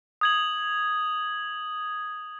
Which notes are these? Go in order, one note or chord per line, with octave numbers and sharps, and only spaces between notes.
D#6 G#6 F#7